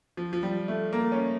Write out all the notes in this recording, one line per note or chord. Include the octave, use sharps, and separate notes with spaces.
F3
F3
G3
A3
A#3
C#4